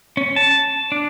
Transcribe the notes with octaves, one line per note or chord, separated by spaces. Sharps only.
C#4
A5
D4